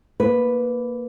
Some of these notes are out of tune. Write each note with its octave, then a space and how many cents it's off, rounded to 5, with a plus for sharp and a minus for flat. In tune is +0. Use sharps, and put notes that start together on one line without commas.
A#3 +0 B4 +0